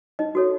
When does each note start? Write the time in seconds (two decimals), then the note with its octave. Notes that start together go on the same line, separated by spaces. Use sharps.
0.19 D#4 D#5
0.35 F#4 A4 C#5